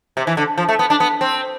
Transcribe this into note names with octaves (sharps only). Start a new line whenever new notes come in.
C3
E3
D3
F3
A3
B3
D4
B3
C4